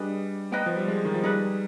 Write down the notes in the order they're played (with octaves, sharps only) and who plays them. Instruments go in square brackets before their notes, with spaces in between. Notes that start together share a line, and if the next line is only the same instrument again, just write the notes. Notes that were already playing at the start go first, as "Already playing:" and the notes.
Already playing: [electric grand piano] G3 [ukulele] D4 G#4 B4 D#5
[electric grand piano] B3 [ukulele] D#4 B4 D#5 G5
[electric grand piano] F3
G3
G#3
D#3
F3
[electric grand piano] G3 [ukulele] D#4 G#4 B4